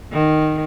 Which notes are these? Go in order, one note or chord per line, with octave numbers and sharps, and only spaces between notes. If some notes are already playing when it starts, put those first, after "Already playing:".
D#3